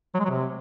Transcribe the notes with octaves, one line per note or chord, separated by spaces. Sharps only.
F#3
G#3
F#3
C3